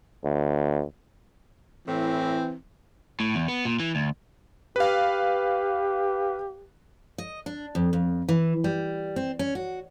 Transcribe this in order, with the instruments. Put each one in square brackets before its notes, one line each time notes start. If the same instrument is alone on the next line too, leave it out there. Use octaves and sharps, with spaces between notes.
[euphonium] D2
[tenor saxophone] A2 [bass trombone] E3 [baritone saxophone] C4
[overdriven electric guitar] A2
E2
B3
A#2
E3
D2
[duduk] G4 [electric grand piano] B4 F5
[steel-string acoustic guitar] D#5
D4
F2
F2
E3
G3
C4
C#4
F#4